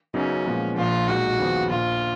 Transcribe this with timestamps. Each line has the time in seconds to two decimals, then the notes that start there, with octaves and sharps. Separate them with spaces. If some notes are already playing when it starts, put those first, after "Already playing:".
0.14 F#2 C#3 F#3 B3 C#4 D#4
0.46 A#2 F3 G#3 B3
0.76 A#1 A#2 F3 F4
1.07 B1 A#2 G#3 D#4 F#4
1.39 D#2 C#3 F3 B3 D#4
1.70 A#1 A#2 F3 F4